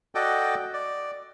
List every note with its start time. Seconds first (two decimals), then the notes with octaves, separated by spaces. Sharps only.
0.15 F#4 A4 D5 D#5 G5
0.73 D5